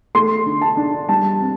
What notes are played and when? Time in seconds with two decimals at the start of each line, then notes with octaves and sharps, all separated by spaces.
0.15 A3 C6
0.46 D3
0.61 A5
0.77 D4
1.09 G3 A5
1.41 C4